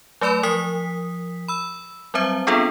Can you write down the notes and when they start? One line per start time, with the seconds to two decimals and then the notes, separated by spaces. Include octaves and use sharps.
0.21 F#3 A3 B4 D5 B5
0.43 F3 A#4 D#6 B6
1.48 B5 E6
2.14 F#3 G3 C4 C5 E5
2.47 B3 C4 D4 F4 G#4 A4